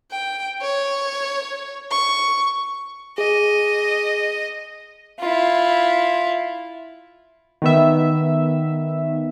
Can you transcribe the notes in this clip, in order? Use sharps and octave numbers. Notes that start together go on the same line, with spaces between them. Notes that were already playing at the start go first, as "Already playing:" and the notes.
G5
C#5
C#6
G#4 D#5
E4 F4
D#3 B3 E5